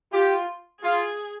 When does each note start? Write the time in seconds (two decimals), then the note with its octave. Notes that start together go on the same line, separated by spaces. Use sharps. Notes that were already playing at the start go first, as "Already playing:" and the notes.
0.13 F4 G4
0.82 F4 G#4